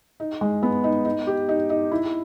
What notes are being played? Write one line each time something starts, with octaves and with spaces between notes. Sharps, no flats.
D#4
G#3
B3
D#4
D#4
G4
D#4
D#4
E4